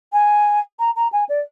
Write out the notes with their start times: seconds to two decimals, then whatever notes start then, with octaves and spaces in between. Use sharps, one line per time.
0.12 G#5
0.79 A#5
0.96 A#5
1.12 G#5
1.29 D5